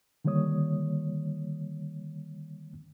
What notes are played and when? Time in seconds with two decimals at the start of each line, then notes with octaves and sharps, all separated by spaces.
0.25 D3 D#3 G3 A#3 C#5 D#6